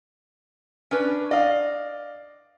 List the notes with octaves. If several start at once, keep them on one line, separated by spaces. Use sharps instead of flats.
C#4 D4 B4
D5 D#5 F5